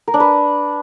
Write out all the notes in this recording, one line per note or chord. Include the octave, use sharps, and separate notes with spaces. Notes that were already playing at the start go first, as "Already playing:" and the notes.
A#4
D4
B4